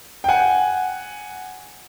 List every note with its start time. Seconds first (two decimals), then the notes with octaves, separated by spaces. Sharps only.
0.24 G5
0.28 F#5 G#5